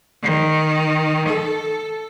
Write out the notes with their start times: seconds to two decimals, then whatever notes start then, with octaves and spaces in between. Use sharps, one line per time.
0.23 D#3
1.29 A4